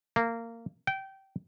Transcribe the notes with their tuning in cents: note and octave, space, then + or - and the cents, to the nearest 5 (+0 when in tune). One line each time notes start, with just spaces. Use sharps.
A#3 -20
G5 -20